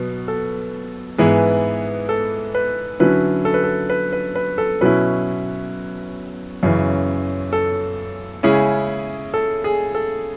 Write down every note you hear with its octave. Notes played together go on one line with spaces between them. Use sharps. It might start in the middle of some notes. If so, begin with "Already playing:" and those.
Already playing: B2 F#3 B3
A4
G#2 E3 B3 E4 G#4
A4
B4
D3 F#3 C#4 E4 B4
A4
B4
A4
B4
B4
B4
A4
B2 F#3 C#4 E4 B4
F#2 C#3 E3
A4
C#3 G#3 C#4 E4 G#4
A4
G#4
A4